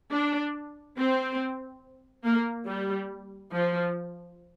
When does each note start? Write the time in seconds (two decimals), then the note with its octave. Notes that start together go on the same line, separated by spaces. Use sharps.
0.12 D4
0.97 C4
2.24 A#3
2.67 G3
3.52 F3